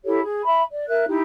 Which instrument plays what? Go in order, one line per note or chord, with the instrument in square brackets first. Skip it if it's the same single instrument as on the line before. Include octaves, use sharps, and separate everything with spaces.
[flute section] E4 G4 A4 C#5
G#4
E5 B5
D5
A#4 E5 F#6
D#4 E4 G4